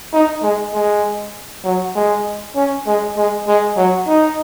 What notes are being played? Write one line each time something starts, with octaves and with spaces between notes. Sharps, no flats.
D#4
G#3
G#3
F#3
G#3
C#4
G#3
G#3
G#3
F#3
D#4